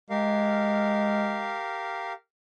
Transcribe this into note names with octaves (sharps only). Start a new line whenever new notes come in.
G#3 G4 A#4 F5